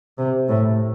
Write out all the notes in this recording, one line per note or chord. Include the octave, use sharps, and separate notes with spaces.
C3
A2